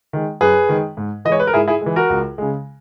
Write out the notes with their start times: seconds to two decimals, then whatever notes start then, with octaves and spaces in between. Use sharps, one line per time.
0.13 D#3 G#3
0.41 F#2 G#4 B4
0.69 D#3 G#3
0.97 G#2
1.25 E3 D#5
1.29 G#3 C#5
1.40 B4
1.47 A#4
1.54 G#2 E4 G#4
1.68 E4 G#4
1.81 E3 G#3
1.96 F#4 A#4
2.10 C#2
2.38 C#3 G#3